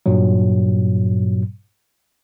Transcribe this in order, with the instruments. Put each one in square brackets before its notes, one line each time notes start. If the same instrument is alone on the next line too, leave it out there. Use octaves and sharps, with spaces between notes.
[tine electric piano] G2 A#2 F#3